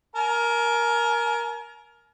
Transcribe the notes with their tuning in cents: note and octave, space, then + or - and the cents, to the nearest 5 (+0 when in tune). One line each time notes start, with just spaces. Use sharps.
A#4 +10 G#5 +40